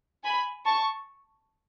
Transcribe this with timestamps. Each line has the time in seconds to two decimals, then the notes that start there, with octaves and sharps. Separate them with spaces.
0.23 G#5 B5
0.65 A5 C#6